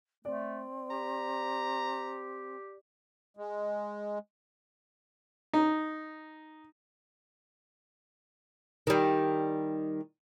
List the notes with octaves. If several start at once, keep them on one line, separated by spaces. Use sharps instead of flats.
A3 C4 D5
G4 A#5
G#3
D#4
D#3 G3